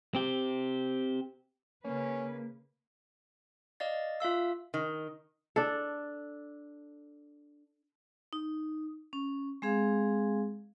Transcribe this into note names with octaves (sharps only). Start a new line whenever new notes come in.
C4 G4
C#3 A#3 C#4 B4
D5 D#5 F5 A6
F4 E5 F5 E6
D#3
D4 A4
D#4
C#4
G#3 C4 G#4 F5